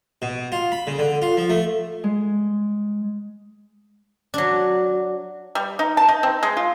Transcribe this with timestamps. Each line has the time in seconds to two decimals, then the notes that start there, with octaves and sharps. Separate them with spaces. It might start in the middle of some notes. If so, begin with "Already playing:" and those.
0.22 B2
0.52 F4
0.72 B5
0.87 C#3
0.98 D3
1.22 F4
1.37 F3
1.50 A3
2.04 G#3
4.34 F#3 D4
5.55 G3
5.79 D#4
5.97 A5
6.09 D#4
6.23 C4
6.43 G#3
6.57 F4